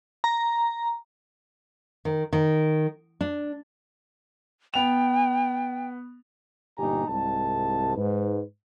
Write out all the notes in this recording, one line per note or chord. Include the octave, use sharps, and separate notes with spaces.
A#5
D#3
D#3
D4
B3 G5 F7
G1 A#2 D#4 G4 G#5 A#5
C2 G#2 A5
G#2 B4